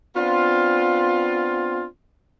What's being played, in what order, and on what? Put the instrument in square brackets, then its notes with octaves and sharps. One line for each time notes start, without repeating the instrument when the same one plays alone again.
[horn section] B3 C4 D4 F4